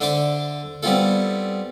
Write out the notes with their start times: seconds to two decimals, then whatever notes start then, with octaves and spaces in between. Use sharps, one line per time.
0.01 D3 D4 C5 E5 D6
0.83 G3 B3 C4 E4 F4 A4